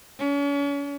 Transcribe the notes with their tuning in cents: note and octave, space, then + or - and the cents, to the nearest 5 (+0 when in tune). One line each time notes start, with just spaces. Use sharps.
C#4 +40